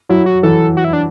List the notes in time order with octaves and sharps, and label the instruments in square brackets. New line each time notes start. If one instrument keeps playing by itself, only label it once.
[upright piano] F#3 [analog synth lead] E4
[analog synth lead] F#4
[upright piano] E3 [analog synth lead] A4
[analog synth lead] F#4
E4
D4